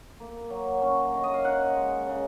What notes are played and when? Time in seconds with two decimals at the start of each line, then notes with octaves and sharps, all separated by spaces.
0.20 A#3
0.50 F#3
0.82 C#4
1.14 D#3
1.24 D#5
1.34 F5
1.44 D#4 F#5
1.76 G#3
2.07 C#3